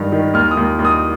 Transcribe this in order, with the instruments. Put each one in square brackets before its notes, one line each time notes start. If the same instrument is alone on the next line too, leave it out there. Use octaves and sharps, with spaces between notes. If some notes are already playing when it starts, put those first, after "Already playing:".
Already playing: [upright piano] G2 D#3
D#3
D#2 F6
D#6
D#2
D#2
D#6